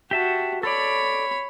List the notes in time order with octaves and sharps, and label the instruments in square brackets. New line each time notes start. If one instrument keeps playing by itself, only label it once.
[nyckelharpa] F#4 [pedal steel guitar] G4 E5 A5
[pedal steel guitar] A4 D5 [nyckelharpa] C#5 B5